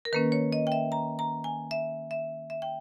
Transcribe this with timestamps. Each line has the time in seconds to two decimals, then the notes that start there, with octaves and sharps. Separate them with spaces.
0.05 A#4
0.13 D#3 A#3 C#4 B4
0.32 C#5
0.53 D#5
0.67 G5
0.72 E5
0.92 A#5
1.19 A#5
1.44 G#5
1.71 E5
2.11 E5
2.50 E5
2.62 G5